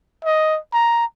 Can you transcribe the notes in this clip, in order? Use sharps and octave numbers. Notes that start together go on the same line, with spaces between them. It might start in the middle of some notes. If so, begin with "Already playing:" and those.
D#5
A#5